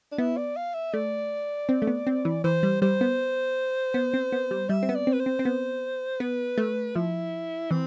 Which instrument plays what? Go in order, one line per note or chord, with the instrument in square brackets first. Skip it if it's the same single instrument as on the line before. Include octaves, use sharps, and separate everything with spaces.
[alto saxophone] D4
[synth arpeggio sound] B3 [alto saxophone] E4
[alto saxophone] D5
F5
E5
[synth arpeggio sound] A3 [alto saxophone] D5
[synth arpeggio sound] C4
A3
B3
C4
E3
[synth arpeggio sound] E3 [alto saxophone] C5
[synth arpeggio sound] G3
[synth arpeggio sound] G3 [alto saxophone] C5
[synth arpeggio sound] B3
B3
C4
B3
G3
[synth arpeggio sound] G3 [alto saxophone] E5
[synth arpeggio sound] C4
B3
[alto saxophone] D5
[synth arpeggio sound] C4
[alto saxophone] B4
C5
[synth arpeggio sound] C4
C4
B3
[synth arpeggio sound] B3 [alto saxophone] B4
[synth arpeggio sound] A3
[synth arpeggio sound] F3 [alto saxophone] E4
[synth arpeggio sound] E3 [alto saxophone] C4